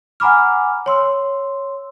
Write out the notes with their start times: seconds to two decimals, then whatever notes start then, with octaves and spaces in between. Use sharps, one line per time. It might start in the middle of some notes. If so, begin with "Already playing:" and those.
0.20 F#5 G#5 A#5 B5 D6 F6
0.86 C#5 C6 E6